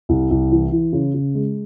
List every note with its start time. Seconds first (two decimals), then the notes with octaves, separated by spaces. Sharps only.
0.09 C2
0.30 C2
0.52 E3
0.72 E3
0.93 C#3
1.14 C#3
1.35 G#3